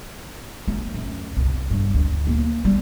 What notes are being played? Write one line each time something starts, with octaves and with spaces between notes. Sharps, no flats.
A3
F#2
C2
G2
D2
A#3
G3